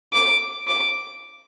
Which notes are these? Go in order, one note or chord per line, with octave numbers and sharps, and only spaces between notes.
D6
D6